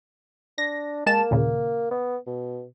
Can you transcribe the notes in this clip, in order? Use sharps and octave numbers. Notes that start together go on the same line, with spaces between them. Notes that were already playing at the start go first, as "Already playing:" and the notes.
D4 A#6
G#3 A#3 A5 E7
D#2 A#2 C#3
B3
B2